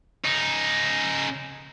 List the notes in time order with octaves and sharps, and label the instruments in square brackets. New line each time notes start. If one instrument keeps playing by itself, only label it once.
[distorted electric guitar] C#3 D#4